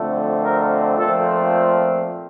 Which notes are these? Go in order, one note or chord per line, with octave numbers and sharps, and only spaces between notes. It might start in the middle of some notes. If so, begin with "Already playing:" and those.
Already playing: F2 D3 A3 C4
A#4
A#2 F3 A3 C4 A4